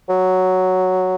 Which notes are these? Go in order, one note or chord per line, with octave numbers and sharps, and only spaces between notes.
F#3